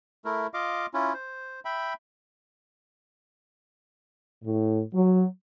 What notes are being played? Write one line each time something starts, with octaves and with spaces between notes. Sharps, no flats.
A3 E4 A#4
F4 D#5 F5 D6
C#4 E4 F4
C5
E5 G5 B5
A2
F#3